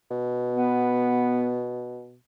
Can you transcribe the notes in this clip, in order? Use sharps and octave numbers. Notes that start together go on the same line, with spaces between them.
B2
B3